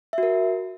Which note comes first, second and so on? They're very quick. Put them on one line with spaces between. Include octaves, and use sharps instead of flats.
E5 F#4 A#4